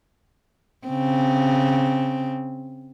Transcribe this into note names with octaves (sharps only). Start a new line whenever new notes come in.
C#3 C4